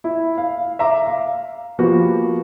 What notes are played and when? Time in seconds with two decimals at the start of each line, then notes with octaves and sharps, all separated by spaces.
0.04 E4
0.38 F5
0.79 E5 A#5 D6
1.06 F5
1.79 F3 A#3 B3 F#4 G4